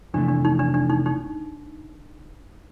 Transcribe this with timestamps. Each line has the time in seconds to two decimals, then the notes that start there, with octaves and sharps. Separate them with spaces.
0.14 F2 C3 E3 A3 D4
0.29 D4
0.45 D#4
0.59 D4
0.74 D4
0.90 D#4
1.06 D#4